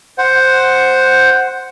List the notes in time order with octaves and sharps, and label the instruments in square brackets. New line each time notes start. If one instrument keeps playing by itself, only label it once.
[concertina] C5 F#5